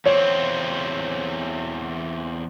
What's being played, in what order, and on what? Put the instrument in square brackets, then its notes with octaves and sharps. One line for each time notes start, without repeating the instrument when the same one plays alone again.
[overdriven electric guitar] E2 C4 [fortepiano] C#5